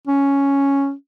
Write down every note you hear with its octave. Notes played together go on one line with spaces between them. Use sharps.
C#4